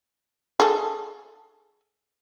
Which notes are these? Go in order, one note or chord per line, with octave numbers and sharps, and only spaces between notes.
G#4 A4